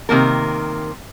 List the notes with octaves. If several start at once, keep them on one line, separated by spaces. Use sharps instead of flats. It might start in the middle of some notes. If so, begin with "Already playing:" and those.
C3 D#3 A#3 A#4